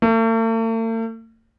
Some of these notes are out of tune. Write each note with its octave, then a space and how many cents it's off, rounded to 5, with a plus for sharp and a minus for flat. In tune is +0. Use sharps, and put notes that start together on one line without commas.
A3 +45